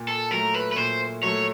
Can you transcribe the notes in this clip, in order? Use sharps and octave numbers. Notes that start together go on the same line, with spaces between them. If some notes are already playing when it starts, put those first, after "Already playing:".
Already playing: A#2
A4
F#3 A3 A#4
B4
B4
A#2 C5
F#3 A3 C#5